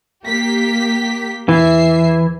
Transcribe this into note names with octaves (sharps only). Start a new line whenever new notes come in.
A#3 G4 B6
E2 E3 E5 C7